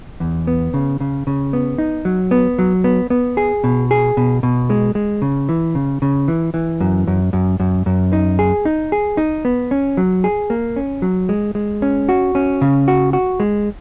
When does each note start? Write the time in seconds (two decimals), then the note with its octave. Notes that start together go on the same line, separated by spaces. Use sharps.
0.20 E2
0.47 B3
0.74 C#3
1.00 C#3
1.27 C#3
1.53 B3
1.78 D#4
2.05 F#3
2.31 B3
2.59 F#3
2.84 B3
3.10 B3
3.37 G#4
3.64 B2
3.91 G#4
4.17 B2
4.43 B2
4.70 G#3
4.95 G#3
5.22 C#3
5.49 E3
5.75 C#3
6.02 C#3
6.28 E3
6.54 E3
6.80 F#2
7.07 F#2
7.33 F#2
7.60 F#2
7.86 F#2
8.13 D#4
8.39 G#4
8.65 D#4
8.92 G#4
9.17 D#4
9.45 B3
9.71 C#4
9.97 F#3
10.24 G#4
10.50 A#3
10.76 C#4
11.02 F#3
11.29 G#3
11.55 G#3
11.82 C#4
12.09 F#4
12.35 C#4
12.61 C#3
12.88 F#4
13.13 F#4
13.40 G#3